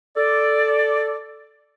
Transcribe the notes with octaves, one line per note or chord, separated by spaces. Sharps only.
A4 D5